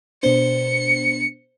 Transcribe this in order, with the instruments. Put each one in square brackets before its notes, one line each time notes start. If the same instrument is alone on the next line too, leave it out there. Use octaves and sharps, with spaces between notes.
[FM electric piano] B2 B3 D4 [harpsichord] C5 [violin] C#7